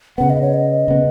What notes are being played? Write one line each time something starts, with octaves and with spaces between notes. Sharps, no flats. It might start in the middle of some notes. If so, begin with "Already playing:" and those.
C#3 B3 F#5
D#5
C#5
D#5
C#3 B3